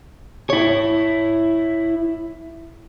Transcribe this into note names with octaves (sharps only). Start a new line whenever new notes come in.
E4 C#5